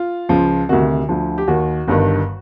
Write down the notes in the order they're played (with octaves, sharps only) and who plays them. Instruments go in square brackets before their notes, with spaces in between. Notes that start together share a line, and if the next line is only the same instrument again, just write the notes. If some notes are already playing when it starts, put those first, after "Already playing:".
Already playing: [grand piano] F4
C#2 C#3 F3
D2 C3 D#3 F#4
D2 D3 F3
G4
D#2 D#3 F#4
G1 G2 D#3